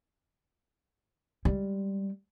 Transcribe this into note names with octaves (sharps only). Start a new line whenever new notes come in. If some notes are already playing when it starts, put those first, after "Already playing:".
G3 G#3